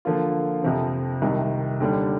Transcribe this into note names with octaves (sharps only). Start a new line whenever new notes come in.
D3 F3 A#3 F4
F2 C3 F3 C4
C2 C3 D#3
D#2 D3 G3